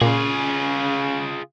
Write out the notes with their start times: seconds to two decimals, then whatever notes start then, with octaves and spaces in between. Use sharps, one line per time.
0.01 A#2 C#3 F4 G#4